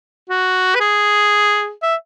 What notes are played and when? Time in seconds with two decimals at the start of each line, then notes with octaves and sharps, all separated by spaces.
0.29 F#4
0.75 B4
0.80 G#4
1.82 E5